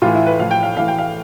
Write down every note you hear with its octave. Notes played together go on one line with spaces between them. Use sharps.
A2 E3 F4
E4
B4
A2 F3 F5
G5
F5
A2 E3 F5
G5
F5